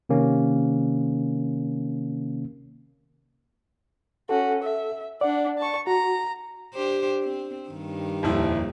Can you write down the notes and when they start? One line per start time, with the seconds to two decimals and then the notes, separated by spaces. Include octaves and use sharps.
0.09 C3 D#3 A#3 C#4
4.29 C#4 F#4 A4
4.63 E5
5.21 D4 D5 F#5
5.58 A5 C#6
5.87 F#4 A#5
6.74 D4 G4 C5
7.23 C4
7.69 G2 D#3
8.23 D#1 F2 E4